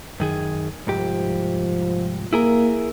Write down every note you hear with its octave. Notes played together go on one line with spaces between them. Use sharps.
F#2 D#3 G#4
C2 G#2 F3 G4
A#3 E4 G#4 A#4